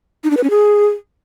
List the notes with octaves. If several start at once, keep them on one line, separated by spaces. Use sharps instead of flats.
D#4
D4
B4
C#4
G#4